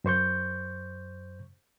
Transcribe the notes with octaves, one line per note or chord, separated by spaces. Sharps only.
F#2 C5 C#6 G6